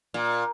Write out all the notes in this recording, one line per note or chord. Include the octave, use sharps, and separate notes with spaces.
A#2